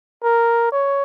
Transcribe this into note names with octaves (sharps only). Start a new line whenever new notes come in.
A#4
C#5